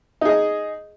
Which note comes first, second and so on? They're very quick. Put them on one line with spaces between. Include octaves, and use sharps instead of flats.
D#4 G#4 D#5